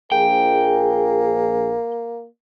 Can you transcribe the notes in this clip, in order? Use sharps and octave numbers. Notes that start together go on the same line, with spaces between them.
A#1 A#3 G#4 G5